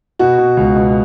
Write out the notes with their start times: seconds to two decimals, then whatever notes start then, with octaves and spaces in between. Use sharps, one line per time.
0.19 B2 F#4
0.38 B2
0.57 C#2
0.76 B2